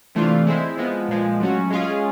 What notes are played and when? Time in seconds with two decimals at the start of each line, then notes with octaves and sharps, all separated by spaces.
0.15 C3 E3 A3 D4 F4
0.47 G#3 C4 E4
0.77 F3 G#3 B3
1.09 A#2 F3 G#3
1.40 F#3 A3 C#4 F#4
1.70 G#3 C#4 F4 G#4